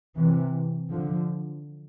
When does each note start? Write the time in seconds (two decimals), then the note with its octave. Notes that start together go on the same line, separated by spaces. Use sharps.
0.17 C3 E3
0.90 D3 F3